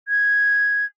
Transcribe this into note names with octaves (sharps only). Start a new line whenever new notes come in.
G#6